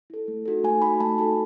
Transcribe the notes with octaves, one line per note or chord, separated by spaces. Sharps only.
E4 A4
A3
D#4 F#4 A4
A3 G#5
D#4 F#4 A4 B5
A3 A5
D#4 F#4 A4 B5